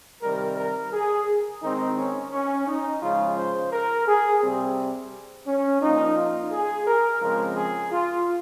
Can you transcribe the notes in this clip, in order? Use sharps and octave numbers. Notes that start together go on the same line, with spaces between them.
C3 D#3 G3 A#4
A#4
G#4
D#3 G#3 C4 D#4
C#4
C#4
D#4
C#3 F3 G#3 F4
C5
A#4
G#4
C3 G3 C4
C#4
A#2 F3 A#3 D#4
F4
G#4
A#4
C#3 F3 G#3 C4 A#4
G#4
F4